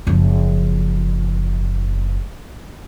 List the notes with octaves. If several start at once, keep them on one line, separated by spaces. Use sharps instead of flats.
F#1 F3